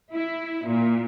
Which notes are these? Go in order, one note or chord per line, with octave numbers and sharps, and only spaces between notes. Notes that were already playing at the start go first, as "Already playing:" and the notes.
E4
A#2